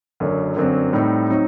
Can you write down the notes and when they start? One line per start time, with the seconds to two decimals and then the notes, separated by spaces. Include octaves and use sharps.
0.20 F#1 F#2 D3 F#3
0.56 G1 F#2 D3 F#3 C4
0.92 A2 G3 C4 D#4
1.29 F#3 C4 D#4